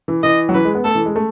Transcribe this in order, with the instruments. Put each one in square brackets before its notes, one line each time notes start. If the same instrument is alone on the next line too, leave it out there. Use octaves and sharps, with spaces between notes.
[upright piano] E3
[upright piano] E3 [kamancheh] D#5
[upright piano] F#3
[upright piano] E3 [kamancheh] B4
[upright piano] G#3
B3
[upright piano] A3 [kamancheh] A4
[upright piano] E3
G#3
A3